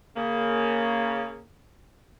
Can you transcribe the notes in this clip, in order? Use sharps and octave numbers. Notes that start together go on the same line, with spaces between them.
C#3 A#3